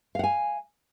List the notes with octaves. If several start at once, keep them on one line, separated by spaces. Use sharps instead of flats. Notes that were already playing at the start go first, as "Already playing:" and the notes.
F5 F#5 G#5